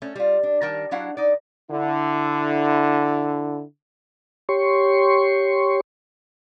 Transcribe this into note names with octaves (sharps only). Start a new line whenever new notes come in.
A3 C#4
G3 F4
D4
D#3 G3 A#4 G5 A5
F#3 D4 E4 F5 F#5
D#4 D5
D3 E4
G4 C#5 C6 C#6